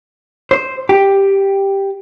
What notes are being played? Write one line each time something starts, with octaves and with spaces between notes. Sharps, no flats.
C5
G4